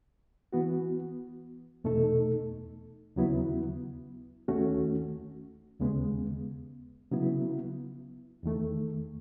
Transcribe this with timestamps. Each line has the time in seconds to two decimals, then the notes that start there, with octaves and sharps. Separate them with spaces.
0.53 E3 B3 F#4
1.84 E2 B2 A3 D#4 A4
3.16 D#2 C#3 F#3 B3 E4
4.48 D#2 D#3 A3 C#4 F#4
5.79 D#2 C#3 G#3 B3
7.11 C#3 F#3 B3 E4
8.43 E2 D#3 A3